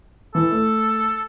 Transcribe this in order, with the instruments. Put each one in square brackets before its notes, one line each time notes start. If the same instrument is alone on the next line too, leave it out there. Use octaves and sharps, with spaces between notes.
[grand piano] E3 [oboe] A4
[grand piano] A3